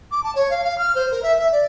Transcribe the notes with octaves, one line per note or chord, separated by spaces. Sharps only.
D6
A5
C#5
F5
F5
F6
C5
A#4
E5
E5
D5